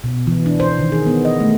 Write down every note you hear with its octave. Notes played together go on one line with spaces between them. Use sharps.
B2
E3
D4
C5
D#3
G#4
B3
D#5
A3